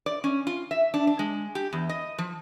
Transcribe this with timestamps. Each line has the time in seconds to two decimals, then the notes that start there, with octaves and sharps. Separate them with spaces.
0.06 D5
0.24 C#4
0.47 F4
0.71 E5
0.94 D4
1.07 D4
1.19 G#3
1.55 G4
1.73 E2
1.89 D#5
2.18 F3